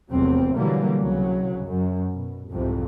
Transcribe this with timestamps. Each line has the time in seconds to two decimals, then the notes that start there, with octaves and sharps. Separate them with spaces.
0.11 F1 E2 F#3 C4
0.56 B2 D3 E3 F#3 G3 A#3
0.98 C2 C#3 F#3
1.64 F#2
2.12 B2
2.51 C2 F2 G#2 C3